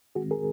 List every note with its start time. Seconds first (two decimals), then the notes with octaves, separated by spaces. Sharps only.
0.15 D#3 G#3 C4 F#4 G#4
0.31 G#4 A#4